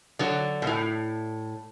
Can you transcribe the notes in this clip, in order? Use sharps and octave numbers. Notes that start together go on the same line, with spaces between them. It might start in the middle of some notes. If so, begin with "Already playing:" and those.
D3 F#3
B2
A2